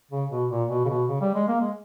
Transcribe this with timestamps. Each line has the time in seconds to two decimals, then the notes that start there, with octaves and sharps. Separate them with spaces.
0.11 C#3
0.31 B2
0.50 A#2
0.69 B2
0.85 C#3
0.89 B2
1.09 C#3
1.21 G3
1.35 G#3
1.48 A#3
1.61 G#3